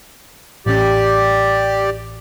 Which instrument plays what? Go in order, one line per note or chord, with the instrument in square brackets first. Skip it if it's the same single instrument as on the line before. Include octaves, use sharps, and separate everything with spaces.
[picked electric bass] A1 C#4 [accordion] G4 D5